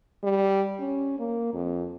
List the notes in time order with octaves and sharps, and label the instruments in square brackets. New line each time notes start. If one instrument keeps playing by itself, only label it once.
[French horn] G3
C#4
A#3
F2